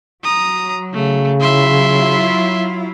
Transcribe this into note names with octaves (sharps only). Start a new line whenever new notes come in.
F#3 A#5 D#6
C#3 A3
F#3 E4 F4 E5 C6